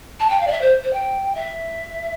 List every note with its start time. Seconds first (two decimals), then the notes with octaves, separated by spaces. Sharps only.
0.19 A5
0.29 G5
0.40 F5
0.47 D5
0.51 E5
0.61 C5
0.83 C5
0.92 G5
1.34 E5